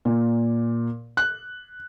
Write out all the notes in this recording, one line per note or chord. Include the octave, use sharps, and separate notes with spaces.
A#2
F#6